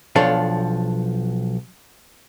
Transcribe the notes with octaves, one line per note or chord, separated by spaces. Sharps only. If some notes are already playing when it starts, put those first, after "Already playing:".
B1 F3 D4 A4 C#5 F5